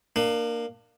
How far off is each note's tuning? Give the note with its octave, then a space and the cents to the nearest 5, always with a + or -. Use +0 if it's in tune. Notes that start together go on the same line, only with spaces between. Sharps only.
A#3 +0 D4 +35